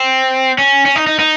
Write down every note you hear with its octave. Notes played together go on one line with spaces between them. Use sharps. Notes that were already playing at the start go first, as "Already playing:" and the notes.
Already playing: C4
C#4
C#4
D#4
D#4
D#4